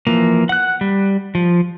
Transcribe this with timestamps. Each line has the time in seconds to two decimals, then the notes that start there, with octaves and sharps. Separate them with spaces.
0.07 E3 F3 A#3
0.49 F#5 F#6
0.81 G3
1.35 F3